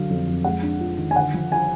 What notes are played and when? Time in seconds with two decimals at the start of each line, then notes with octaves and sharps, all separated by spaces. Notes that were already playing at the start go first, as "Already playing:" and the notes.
Already playing: D3 F#3 F5
0.10 F2
0.27 F2
0.44 G#3 F#5
0.63 D4
0.80 F4
0.98 D#3
1.11 G#5
1.16 D3 F#5
1.34 F3
1.52 G#5